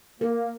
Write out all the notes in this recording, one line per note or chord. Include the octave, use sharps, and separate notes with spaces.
A#3 A#4